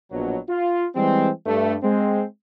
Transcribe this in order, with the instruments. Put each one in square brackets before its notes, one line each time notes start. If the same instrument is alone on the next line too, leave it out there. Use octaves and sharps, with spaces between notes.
[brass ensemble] A#1 B2 F#3
F4
E3 G3 G#3 C4
G2 A3
G#3 C4